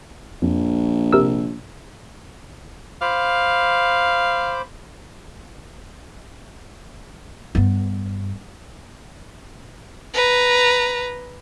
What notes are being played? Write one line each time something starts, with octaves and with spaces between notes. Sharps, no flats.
A#1 F2
C3 A#4 E6
C5 F5 B5 D6
G2 B3
B4 A#5